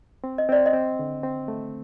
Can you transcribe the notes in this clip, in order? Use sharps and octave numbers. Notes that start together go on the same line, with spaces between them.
C4
D#5
C4 D5
D#5
C4
D3
C4
A3